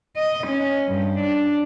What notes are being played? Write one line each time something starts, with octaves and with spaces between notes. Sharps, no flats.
D#5
C#4
G2
D4